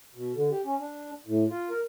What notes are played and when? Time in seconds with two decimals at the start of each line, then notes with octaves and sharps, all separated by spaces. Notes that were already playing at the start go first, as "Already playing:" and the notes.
0.15 B2
0.35 D3
0.51 G4
0.64 C#4
0.80 D4
1.27 A2
1.50 F4
1.70 A#4